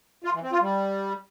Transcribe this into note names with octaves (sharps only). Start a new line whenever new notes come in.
F4
E3
C4
F4
G3